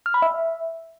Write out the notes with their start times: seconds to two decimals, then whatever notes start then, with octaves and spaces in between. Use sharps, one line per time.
0.06 F6
0.14 B5
0.22 E5